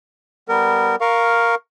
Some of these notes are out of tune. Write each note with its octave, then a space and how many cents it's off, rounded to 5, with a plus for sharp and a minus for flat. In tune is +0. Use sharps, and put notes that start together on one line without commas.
G3 +0 B3 +0 A#4 -20
A#4 +0 F5 +0 C#6 +0